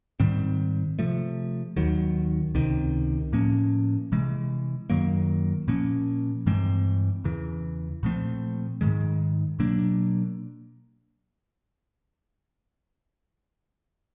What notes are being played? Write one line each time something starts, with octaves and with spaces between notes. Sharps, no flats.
G#2 D#3 G3 C4
C3 F3 A3
D#2 D#3 F#3
C#2 C3 D#3
A2 F3 A#3 C#4
C3 E3 G#3
F#2 D#3 F#3 A#3
A#2 F3 A#3 C#4
G2 E3 G#3 C4
E2 C#3 E3
A#2 F3 A3 C4
G#2 D#3 G#3
B2 F#3 A#3 D4